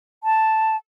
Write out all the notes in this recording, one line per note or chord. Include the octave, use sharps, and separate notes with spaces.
A5